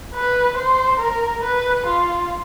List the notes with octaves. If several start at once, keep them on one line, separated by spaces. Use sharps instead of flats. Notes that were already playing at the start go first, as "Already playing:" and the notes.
B4
C5
A#4
B4
F4